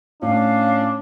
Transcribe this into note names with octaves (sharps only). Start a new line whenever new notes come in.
A2 C#4 D4 F5